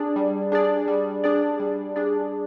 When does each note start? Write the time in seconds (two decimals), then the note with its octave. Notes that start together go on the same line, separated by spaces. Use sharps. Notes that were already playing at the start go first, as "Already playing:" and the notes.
Already playing: D4 G#4 D5
0.16 G3
0.52 D4 G#4 D5
0.88 G3
1.24 D4 G#4 D5
1.60 G3
1.96 D4 G#4 D5